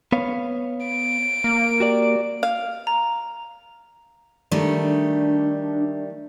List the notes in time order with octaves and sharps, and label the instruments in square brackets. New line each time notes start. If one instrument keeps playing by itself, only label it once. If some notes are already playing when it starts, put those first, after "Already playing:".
[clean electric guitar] B3 C#5 F5
[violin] D7
[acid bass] A#3
[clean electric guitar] F#4 G4 D5
[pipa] F5
[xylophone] A#5
[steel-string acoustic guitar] D#3 G3 A3 [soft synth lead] D4